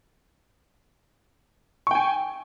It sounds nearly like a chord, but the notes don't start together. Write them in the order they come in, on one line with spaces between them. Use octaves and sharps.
C#6 G5 G#5